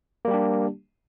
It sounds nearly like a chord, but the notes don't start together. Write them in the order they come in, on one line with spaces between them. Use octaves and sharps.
A#3 G3 G4 D4